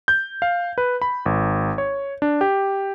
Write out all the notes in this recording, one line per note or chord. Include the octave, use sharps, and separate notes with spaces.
G6
F5
B4
B5
G#1
C#5
D4
G4